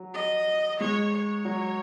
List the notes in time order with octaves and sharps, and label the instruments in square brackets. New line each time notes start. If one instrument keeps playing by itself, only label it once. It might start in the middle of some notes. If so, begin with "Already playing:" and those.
Already playing: [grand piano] F#3
[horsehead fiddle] D#5
[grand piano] G#3 [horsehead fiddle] C#5
[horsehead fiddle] C#5
[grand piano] F#3